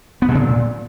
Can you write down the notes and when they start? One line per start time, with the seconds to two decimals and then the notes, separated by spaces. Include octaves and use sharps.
0.22 B3
0.28 B2
0.35 C#3
0.41 A#2